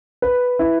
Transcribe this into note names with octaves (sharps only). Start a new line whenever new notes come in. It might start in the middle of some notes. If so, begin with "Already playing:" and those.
B4
E4